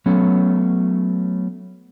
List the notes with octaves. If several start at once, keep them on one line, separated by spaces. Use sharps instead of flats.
F#3 A3 B3 C#4